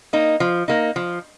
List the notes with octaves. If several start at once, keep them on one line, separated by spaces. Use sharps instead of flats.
A#3 D#4
F3
A#3 D#4
F3